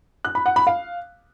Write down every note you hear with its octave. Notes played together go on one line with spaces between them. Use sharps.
F#6
B5
F#5
B5
F5